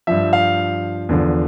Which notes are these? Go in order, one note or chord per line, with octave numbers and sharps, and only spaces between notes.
G2 F3 E5
F5
E2 D3 F3